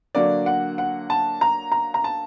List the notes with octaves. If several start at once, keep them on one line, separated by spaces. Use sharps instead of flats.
D3 F#3 A#3 D5
F#5
F#5
A5
A#5
A#5
A#5
A5